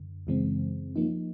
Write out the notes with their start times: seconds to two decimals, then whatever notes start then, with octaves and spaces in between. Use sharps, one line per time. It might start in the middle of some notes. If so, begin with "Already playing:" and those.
Already playing: F#2 D3
0.27 F#2 C#3 E3 G#3 C4
0.96 F3 A#3 D#4